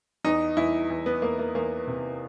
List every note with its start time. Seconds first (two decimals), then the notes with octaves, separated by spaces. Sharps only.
0.25 E2 D#4
0.57 E2 E4
0.90 E2
1.06 B3
1.22 E2 A#3
1.39 A#3
1.55 E2 A#3
1.87 C3